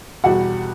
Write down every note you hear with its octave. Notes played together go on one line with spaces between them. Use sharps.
E2 B2 G3 F#4 F#5